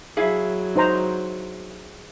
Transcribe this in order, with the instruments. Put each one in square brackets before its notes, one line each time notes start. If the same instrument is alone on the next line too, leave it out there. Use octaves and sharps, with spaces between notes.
[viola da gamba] F#3 [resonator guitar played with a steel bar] E4 G#4 F5
[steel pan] D#4 C5 A#5